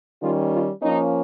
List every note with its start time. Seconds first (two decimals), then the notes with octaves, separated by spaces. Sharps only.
0.21 D#3 G3 C#4 F4
0.51 F4
0.81 F3 A#3 C#4 D#4